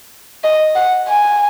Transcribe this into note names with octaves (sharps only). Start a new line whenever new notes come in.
D#5
F#5
G#5